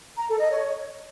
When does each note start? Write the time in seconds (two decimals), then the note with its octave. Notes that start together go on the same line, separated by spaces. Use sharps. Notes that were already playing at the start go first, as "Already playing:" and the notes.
0.17 A#5
0.28 A4
0.39 D#5
0.50 C#5